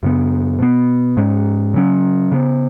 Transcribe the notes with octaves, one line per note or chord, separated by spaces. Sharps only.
F#2 C#3 B3
B2 B3
G#2 G#3 C#4
C#3 F#3 C#4
C#3 B3